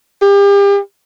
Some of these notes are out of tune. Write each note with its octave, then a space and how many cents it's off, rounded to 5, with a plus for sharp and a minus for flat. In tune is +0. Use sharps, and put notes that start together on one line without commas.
G4 +35